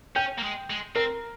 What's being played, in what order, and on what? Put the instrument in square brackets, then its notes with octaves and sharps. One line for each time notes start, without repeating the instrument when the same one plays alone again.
[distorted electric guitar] C#4 [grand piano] G5 G6
[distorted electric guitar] A#3
G#3
G#3
[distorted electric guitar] C4 [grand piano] A#4 A#5